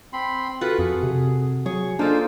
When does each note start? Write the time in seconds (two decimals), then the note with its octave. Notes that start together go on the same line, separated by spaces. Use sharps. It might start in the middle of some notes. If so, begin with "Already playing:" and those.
0.13 C4 B5 C6
0.61 F4 F#4 A4 B4 F#6
0.79 F2 G#4
1.03 C3
1.66 F#3 G#4 C#6
1.99 A#3 D4 D#4 F4 A4 C5